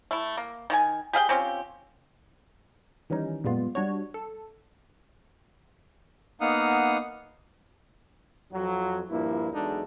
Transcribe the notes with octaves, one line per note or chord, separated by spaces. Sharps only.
A3 E4
A#3
D#3 F#4 G#5
G4 G#4 F5 G5
C4 C#4 F4 G4
D#3 E3 G3 C#4 D#4
F#2 A#2 G3 G#3 B3 F4
G3 D4 F#4 C#5
A4
A#3 B3 D#4 F5 F#5 D#6
F2 F#3
G2 A#2 F3 A#3 E4
E2 F#3 G#3 D4 D#4 A4